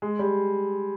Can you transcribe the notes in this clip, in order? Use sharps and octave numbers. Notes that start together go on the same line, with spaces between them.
G#3
G3